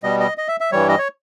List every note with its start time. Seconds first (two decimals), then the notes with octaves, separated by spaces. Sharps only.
0.03 B2 G3 D#5
0.20 D#5
0.38 D#5
0.48 E5
0.60 E5
0.72 G2 E3 G3 C#5
0.89 D#5
0.98 C#5